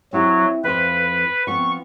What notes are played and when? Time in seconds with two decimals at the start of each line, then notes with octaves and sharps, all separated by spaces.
0.13 F#3 C4 E4 G4
0.64 F2 F3 B4 C5
1.47 F3 B3 C4 C#6